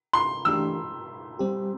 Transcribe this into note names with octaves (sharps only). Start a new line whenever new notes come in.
C6
E3 A3 D4 G4 E6
G3 C4 G4